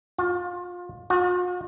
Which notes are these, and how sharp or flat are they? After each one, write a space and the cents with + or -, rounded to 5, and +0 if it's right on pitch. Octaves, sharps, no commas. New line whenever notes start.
F4 +25
F4 +45